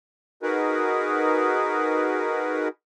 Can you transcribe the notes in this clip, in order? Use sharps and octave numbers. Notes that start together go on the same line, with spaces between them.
D#4 F#4 G#4 A#4 B4